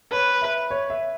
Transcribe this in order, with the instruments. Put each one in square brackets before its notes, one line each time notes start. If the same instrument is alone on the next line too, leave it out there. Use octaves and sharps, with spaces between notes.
[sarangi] B4 [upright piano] C#5
[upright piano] E5
C#5
E5